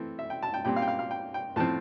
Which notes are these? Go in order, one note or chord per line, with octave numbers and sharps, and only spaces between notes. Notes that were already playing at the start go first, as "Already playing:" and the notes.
Already playing: E3 A3 C4
E5
G5
A5
G5
A#2 G3 C4 G5
F5
G5
F5
F5
G5
G5
A2 F3 C4 A5